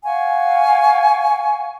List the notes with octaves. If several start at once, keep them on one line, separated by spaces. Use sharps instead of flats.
F5 F#5 G#5 C#6